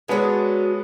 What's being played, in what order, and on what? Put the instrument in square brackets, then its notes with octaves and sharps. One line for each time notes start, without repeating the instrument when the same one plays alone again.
[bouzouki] F#3 D4 G#4 [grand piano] G#3 B3